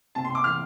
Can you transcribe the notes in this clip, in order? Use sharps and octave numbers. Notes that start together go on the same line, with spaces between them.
C3 A5
C6
C3
D6
E3 F6